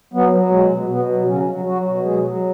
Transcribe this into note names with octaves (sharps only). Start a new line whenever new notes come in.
F#3 B3
F#3
B2 G#3
B2
B2 B3
F#3
C#3 F#3 C#4
F#3
F#3 F#4
B2
F#3 G#3 G#4
F#3